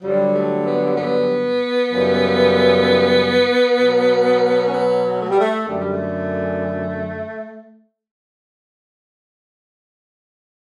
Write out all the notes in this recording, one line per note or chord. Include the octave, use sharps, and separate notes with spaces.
G2 D3 F#3 G3
A3
B3
B3
F#2 C#3 E3 G3
B2 F#3
C#4
B3
A3
G3
A3
F#2 D3 G3 A3
G3
A3